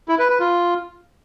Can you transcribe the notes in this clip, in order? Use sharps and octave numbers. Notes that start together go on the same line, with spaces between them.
E4
B4
B4
F4